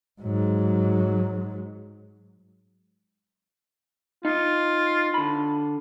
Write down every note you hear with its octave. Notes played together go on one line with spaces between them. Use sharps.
G#2 F#3
D#4 F4
D3 B5